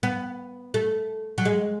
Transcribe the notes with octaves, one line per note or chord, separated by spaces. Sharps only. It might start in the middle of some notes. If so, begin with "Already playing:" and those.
B3
A3
F#3
G#3